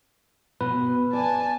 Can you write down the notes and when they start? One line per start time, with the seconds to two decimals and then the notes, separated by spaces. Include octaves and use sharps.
0.61 B2 B4
1.13 D5 G#5 A5